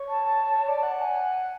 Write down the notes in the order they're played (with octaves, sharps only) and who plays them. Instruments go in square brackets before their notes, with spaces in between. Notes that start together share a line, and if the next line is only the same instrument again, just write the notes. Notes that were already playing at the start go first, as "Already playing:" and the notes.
Already playing: [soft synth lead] C#5
[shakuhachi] A5
[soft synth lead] C#5
C#5
D5
F#5
[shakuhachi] G#5